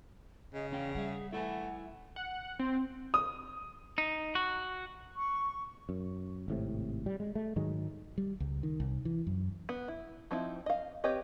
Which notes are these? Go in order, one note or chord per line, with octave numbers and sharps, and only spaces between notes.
C#3 D#5
E2 C#4 F5 G5
G3 G#4 E5 F#5
A3 E4 E5 F#5 G#5
F#5
C4
D#6
D#4
F#4
C#6
F#2
G#1 A2 C3
G3
G#3
A3
G#2 D#3 F#3 G#3
G3
C#2
D#3
C2
E3
F#2
B3
E4
F3 C4 D#4 E4
D#5 F5
C4 G4 B4 C#5 D#5